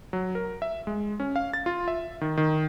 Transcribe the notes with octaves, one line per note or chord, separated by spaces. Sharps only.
F#3
A#4
E5
G#3
C#4
F5
A6
F4
E5
D#3
D#3